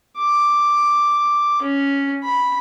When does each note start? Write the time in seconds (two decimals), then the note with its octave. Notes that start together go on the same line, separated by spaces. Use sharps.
0.18 D6
1.62 C#4
2.24 B5